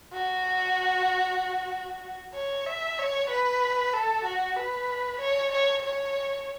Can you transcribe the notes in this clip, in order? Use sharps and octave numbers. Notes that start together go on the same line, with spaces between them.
F#4
C#5
E5
C#5
B4
A4
F#4
B4
C#5
C#5
C#5